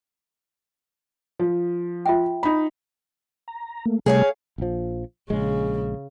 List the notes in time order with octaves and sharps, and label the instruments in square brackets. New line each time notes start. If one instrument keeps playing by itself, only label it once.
[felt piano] F3
[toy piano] F4 E5 G5
[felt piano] D#4 B5
[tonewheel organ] A#5
A3 A#3
[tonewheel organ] C3 G3 A3 [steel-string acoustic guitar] G#4 C#5 F5
[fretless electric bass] A#1 F3
[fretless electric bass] A#1 G#3 [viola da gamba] C#3